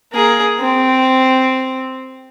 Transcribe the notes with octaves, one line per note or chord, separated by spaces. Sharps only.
A#3 G#4
C4